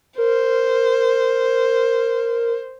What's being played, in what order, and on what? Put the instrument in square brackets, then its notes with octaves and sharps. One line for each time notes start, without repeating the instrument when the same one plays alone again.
[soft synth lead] A#4 [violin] C5